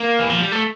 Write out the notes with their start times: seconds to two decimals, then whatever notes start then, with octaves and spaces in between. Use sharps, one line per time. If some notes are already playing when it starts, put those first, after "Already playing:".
Already playing: A#3
0.19 E3
0.30 F3
0.41 G3
0.52 A3